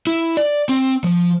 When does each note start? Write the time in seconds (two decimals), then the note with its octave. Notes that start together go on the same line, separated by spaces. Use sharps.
0.07 E4
0.37 D5
0.69 C4
1.04 F3